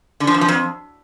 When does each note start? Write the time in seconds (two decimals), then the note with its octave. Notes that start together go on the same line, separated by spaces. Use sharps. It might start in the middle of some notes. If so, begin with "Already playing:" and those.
0.20 D3
0.27 F3
0.34 F2
0.41 F3
0.48 F2